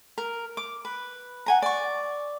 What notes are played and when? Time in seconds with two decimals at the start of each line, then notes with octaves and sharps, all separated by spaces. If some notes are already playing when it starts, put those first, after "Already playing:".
0.18 A#4
0.57 D6
0.85 B4
1.46 F#5 G#5 A#5
1.62 D5 C#6